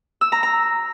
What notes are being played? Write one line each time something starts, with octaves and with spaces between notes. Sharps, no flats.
E6
A#5
A#5